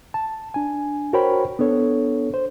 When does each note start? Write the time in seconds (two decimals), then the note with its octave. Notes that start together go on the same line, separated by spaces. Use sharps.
0.14 A5
0.54 D4 G#5
1.13 F#4 A#4 C5 C#5 G5 B5
1.59 B3 D4 A4 C#5
2.34 C5